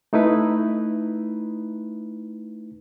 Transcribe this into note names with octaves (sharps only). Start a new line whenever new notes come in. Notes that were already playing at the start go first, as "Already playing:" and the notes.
A3 D#4 E4 B4